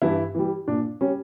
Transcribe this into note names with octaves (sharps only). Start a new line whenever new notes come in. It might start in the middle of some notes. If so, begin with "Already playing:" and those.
G2 E3 E4
E3 G3
A#2 D4
G3 C#4